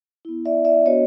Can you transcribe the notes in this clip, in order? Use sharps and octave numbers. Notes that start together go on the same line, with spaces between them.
B3 E4
D5 E5
D5 E5
B3 D4 F#4 C#5 D#5